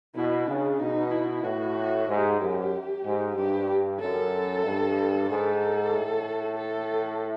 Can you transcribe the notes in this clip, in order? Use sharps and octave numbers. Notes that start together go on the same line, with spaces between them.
B2 E4
C#3 D4
B2 D#4
E4
A2 F#4
G#2 G4
F#2
G#2
G2 G4
F#2 A4
G2
G#2 A4
A2
A4